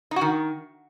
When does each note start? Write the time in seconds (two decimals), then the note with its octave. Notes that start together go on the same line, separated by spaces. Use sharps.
0.11 D#4
0.16 F#4
0.21 D#3